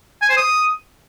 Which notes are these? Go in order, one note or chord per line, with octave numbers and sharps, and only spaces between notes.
G#5
C5
D#6